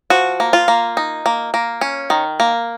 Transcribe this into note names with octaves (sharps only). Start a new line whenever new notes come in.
F3 F#4
A#3
F4
A#3
D#4
A#3
A#3
C#4
D#3
A#3